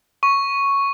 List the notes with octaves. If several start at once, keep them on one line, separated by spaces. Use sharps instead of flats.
C#6